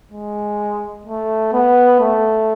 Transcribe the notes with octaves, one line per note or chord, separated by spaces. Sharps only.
G#3
A3
B3
A3